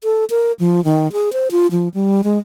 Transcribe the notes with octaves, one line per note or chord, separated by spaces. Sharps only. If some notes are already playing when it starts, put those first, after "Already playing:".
A4
A#4
F3
D#3
G#4
C5
F4
F3
G3
G#3